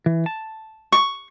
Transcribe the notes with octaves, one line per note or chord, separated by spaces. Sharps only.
E3
A5
C#6